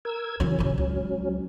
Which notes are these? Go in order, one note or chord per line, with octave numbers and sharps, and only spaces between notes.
A#4 E6 G#6
C#3 E3 F#3 C#4
D1 C#3
C#2